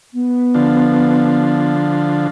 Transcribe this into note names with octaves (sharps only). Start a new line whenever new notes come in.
B3
D3 F3